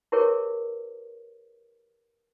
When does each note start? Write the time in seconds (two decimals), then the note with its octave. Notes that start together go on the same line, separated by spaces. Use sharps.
0.12 E4 G4 G#4 A#4 B4 C#5